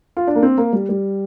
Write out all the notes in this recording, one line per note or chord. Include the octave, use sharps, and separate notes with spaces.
F4
D4
A#3
C4
A#3
G3
G3